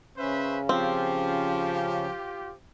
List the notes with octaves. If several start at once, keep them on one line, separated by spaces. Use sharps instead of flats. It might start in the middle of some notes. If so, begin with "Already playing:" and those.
C#3 C#4 B4 C5 E5
F3 C4 F4 G4